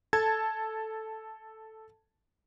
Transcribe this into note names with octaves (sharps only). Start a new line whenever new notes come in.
A4 A5 G#6